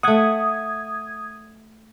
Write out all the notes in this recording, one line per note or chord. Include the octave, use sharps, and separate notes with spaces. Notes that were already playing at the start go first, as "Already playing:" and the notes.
A3 F#5 D#6 G#6